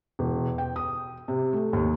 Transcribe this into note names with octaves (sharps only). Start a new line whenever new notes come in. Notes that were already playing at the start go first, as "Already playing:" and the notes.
E1
G5
D#6
C3
A3
D#2